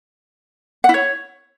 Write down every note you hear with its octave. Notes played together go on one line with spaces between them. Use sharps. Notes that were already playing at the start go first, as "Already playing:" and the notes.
F#5
E4
C#5